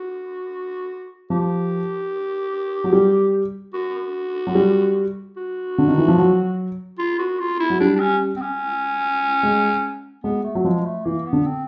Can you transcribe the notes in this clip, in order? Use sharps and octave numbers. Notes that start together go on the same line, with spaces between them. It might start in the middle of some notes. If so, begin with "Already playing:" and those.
Already playing: F#4
F3 G4
F#3
G3
F#4
F#3
G3
F#4
D3
D#3
E3
F3
F#3
F4
F#4
F4
E4
F#3
G3 D4
D4
C#4
C4
C#4
G#3
G#3 B3
A3
F#3
F3 G#3
A3
E3 A#3
B3
D3
C4